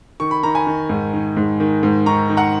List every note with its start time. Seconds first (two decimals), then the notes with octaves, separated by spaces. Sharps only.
0.20 D#3 C#6
0.31 B5
0.43 D#3 A#5
0.55 G#5 B5
0.67 D#3
0.89 G#2
1.14 D#3
1.37 G#2
1.60 D#3
1.83 G#2
2.06 D#3 A#5 C#6
2.29 D#3
2.37 F#5 A#5